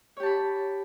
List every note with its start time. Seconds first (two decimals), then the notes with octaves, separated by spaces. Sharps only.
0.17 C#5
0.20 G4
0.23 A5
0.26 B5